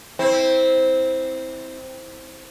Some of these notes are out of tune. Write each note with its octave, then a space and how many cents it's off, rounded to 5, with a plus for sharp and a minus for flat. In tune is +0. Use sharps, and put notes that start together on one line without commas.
C4 +0 E4 -25